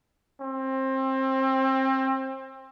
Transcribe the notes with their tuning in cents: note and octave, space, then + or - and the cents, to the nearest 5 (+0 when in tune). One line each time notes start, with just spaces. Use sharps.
C4 +25